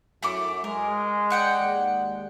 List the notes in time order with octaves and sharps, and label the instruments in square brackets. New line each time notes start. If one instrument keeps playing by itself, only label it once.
[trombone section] F#2 [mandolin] A3 E4 D6
[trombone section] G#3 [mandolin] A#4
[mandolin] D5 F#5 G5
[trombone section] D#2 G#3